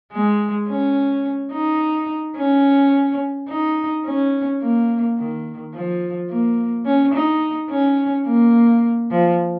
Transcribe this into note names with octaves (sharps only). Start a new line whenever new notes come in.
G#3
C#4
D#4
C#4
D#4
C#4
A#3
D#3
F3
A#3
C#4
D#4
C#4
A#3
F3